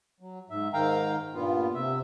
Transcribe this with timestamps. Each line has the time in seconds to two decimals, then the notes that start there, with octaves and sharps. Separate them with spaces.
0.20 F#3
0.50 G#2 E5
0.73 G#2 D#3 F5 G5 A#5
1.34 G2 A#2 B3 F4
1.74 C3 E5